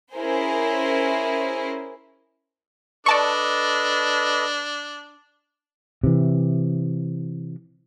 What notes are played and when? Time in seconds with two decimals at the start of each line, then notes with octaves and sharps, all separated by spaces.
0.14 C#4 E4 G#4 A#4 C5
3.06 D4 A4 B4 D5 D#5 A5 C#6
6.04 C3 E3